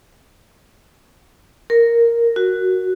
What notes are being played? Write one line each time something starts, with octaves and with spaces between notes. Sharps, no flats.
A#4
F#4